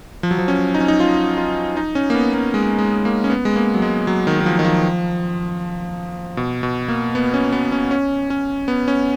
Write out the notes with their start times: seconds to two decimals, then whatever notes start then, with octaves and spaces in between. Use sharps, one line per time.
0.23 F3
0.31 F#3
0.38 F3
0.48 C#4
0.74 D#4
0.81 C#4
0.88 D#4
1.00 F4
1.38 F4
1.77 D#4
1.95 C#4
2.10 A#3
2.15 B3
2.34 A#3
2.54 G#3
2.78 G#3
3.05 A#3
3.24 C#4
3.30 B3
3.45 G#3
3.56 A#3
3.74 F#3
3.82 G#3
4.07 F#3
4.27 D#3
4.40 D#3
4.46 F3
4.59 D#3
4.65 F3
6.37 B2
6.63 B2
6.88 A#3
7.15 B3
7.34 C#4
7.52 B3
7.72 C#4
7.91 C#4
8.30 C#4
8.68 B3
8.88 C#4